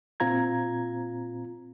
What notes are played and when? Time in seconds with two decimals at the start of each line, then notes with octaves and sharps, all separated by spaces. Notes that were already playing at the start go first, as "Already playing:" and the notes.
0.20 A#2 C4 F4 A#5 G#6